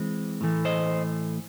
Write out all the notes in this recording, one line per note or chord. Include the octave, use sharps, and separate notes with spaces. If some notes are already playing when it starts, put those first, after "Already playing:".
Already playing: E3 G#3 C4
A2 E3 A3
C5 D#5